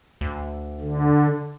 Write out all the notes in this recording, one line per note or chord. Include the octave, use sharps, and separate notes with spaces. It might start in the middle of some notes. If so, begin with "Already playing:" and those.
D2
D3